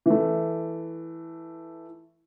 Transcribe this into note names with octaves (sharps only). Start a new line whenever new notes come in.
E3 A3